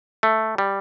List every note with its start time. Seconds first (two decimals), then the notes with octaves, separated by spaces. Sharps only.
0.23 A3
0.58 G3